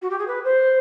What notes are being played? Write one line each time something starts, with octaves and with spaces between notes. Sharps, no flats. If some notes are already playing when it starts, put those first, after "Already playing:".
F#4
G4
G#4
B4
C5